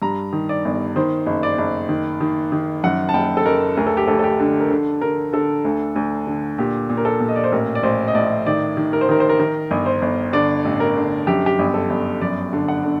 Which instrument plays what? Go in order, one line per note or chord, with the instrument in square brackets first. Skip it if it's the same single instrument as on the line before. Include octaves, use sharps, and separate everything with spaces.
[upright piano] G2 A#5
D#3
D5
G1
D#3 C5
F#1
D5
F#1
D#3
D#3
D#3
F#2 F#5
A5
F#1 G5
A4
F#1 A#4
D2 A#4
A4
G4
D2 A4
A4
G4
D3
A#4
D3 A4
D3 A#4
D3 A4
D2
D2
D3
A#2 G4
A#2
A#4
A4
A#2
D#5
D5
C5
A1 A#4
D5
A1 C5
D#5
A2 D5
D#3 D5
D#3
A#4
C5
D#3 A#4
C5
A#4
D#3 A#4
G1
C5
G1
D3 D5
A1
A#4
D3
F#2 G4
G4
G1
A4
G1
F#2 D5
D3
F#5
D3